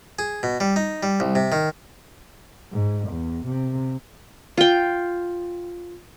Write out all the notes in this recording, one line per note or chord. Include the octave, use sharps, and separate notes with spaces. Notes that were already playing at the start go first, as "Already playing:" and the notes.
G#4
B2
G3
D#4
G3
C2
C3
D#3
G#2
E2
C3
F4 G5